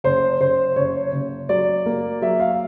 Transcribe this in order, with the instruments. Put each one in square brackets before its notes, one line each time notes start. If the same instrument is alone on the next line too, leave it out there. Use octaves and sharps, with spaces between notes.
[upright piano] F#1 C5
F#1 C5
F#1 C#5
F#1
F#3 D5
A#3
F#3 E5
F5